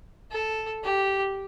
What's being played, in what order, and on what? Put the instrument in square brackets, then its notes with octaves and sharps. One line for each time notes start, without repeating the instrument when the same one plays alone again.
[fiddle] A4
G4